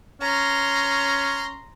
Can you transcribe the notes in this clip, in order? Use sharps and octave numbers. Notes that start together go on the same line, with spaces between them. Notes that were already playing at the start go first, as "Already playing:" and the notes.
C#4 A#5 C6